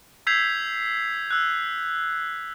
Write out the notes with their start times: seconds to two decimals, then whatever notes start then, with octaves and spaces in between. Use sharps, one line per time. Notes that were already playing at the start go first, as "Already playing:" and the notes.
0.27 E6 G6 G#6 B6 C7 F7
1.31 E6 F#6